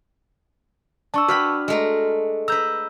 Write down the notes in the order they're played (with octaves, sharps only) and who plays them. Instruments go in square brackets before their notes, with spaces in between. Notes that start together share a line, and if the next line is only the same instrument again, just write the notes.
[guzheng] D4 [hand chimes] A5 C#6 E6
[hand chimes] F#4 F6 [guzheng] B4 G5 B5
[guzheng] G#3 A3 A#5
[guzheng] B4 A#5 [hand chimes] E6 G6